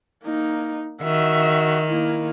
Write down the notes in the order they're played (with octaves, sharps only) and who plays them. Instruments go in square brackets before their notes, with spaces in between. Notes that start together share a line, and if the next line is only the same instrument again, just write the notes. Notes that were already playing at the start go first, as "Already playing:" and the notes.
[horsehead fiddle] A#3 D#4
[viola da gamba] D#3 [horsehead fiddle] F#4 E5
[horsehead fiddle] A#3 E4